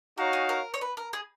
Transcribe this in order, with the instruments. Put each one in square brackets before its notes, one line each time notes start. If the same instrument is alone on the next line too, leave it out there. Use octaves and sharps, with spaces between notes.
[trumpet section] D#4 F#4 C#5 F5 [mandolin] A#4
[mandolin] G#4
A#4
C#5
B4
A#4
G#4